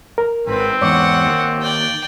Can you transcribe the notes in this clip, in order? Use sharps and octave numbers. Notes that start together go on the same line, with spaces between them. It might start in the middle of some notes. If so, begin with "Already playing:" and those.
A#4
G#1 C4 B4
E2 G#2 C#5 F#5 C#6 D6
D#2
D5 G5